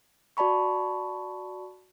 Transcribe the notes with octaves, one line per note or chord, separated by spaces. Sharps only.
F#4 D5 A5 B5 C#6